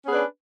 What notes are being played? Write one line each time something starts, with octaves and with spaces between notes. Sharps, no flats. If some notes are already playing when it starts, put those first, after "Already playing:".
B3 C#4 D4 G#4 B4